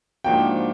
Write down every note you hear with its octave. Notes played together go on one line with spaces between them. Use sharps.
G#2 F3 A#3 D4 F#4 G5